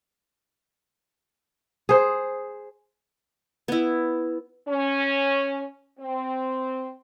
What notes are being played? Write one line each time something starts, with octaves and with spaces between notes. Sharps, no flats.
G#4 C5
B3 E4
C#4
C4